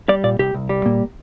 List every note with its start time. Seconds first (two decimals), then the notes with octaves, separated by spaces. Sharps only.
0.09 G3 D5
0.24 A#2 D5
0.39 C2 G4
0.54 C2
0.69 G3
0.85 A#2 A#3